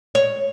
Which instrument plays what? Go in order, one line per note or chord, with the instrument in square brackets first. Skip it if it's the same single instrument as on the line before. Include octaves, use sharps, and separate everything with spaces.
[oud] C#5